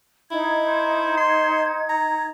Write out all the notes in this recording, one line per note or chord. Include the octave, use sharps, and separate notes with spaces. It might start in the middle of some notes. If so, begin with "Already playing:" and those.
D#4 E4 G#6
C5
C6
A#5